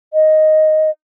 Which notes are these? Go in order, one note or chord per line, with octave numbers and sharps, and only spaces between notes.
D#5